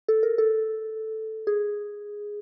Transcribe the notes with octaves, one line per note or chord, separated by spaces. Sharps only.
A4
A#4
A4
G#4